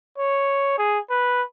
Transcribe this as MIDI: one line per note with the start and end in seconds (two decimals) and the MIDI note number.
0.18 0.74 73
0.78 0.99 68
1.10 1.42 71